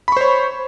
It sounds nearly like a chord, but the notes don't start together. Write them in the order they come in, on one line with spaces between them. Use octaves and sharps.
B5 C#6 C5 C#5